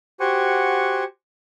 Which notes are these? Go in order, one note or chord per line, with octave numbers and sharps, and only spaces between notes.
F#4 G4 C5 F#5 G#5 C#6